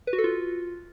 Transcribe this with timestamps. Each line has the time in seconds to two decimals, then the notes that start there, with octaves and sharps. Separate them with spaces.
0.07 B4
0.13 F#4
0.18 A4
0.24 F4